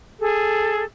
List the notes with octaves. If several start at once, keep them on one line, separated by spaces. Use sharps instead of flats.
G#4 A4